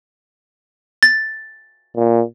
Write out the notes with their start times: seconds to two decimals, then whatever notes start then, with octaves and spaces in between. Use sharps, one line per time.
1.03 A6
1.96 A#2